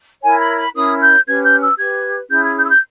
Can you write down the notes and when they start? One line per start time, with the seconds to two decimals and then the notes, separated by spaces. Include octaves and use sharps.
0.22 E4 A#4 C#5 G#5
0.40 B5
0.56 B5
0.74 C#4 E4 A#4 C#5 D#6
1.00 G6
1.26 C#4 G4 B4 G#6
1.43 G6
1.61 E6
1.78 G4 B4 G#6
2.30 C#4 E4 G#4 G6
2.44 G#6
2.56 G6
2.64 E6
2.68 G6